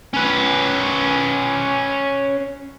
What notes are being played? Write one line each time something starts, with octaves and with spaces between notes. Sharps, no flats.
C#4 B4